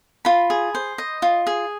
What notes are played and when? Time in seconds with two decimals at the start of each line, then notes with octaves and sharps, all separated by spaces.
0.25 F4 B5
0.50 G#4
0.75 C5
0.98 D#5
1.22 F4
1.47 G#4